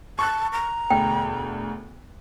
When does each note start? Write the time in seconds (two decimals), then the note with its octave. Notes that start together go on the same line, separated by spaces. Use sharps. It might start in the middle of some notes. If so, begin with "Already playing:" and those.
0.19 A5 C#6 F#6
0.52 A#5
0.90 E1 D2 G5